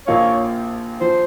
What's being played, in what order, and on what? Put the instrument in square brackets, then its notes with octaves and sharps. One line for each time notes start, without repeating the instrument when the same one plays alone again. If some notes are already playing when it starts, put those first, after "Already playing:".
[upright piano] A#1 A#2 F3 A#3 F4 [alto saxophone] C#5
[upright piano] F3 [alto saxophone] C5